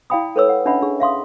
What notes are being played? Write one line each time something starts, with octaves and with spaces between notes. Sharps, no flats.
E4 D5 F5 G5 B5 D#6
A4 B4 C#5 E6
F#5
C#4 D4 D#5 E5 F#5 B5
D4 G#4
E5 F5 C6 D#6